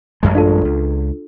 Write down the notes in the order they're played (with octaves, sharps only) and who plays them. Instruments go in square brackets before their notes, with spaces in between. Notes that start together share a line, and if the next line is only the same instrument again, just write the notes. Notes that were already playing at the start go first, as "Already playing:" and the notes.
[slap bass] A1 F#2 G#3
[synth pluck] D4 F4 A4
[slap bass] C#2